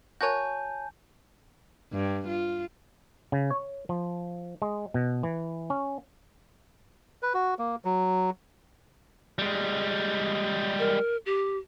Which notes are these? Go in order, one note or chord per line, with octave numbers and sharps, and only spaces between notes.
F#4 A#4 C#5 G#5 A5 G6
G2
F4
C#3
C#5
F3
G#3
B2
E3
C#4
B4
F#4
A#3
F#3
G3 G#3
A#4
G4